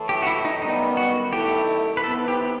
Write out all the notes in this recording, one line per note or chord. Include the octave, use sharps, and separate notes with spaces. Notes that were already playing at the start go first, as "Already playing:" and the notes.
Already playing: A2 E3 A3
G4
F#4
E4
D#4
F#2 D#3 G3 B3 D#4
F#4
F#2 D#3 A3 E4 G4
B4
C3 E3 B3 D#4 A4
G4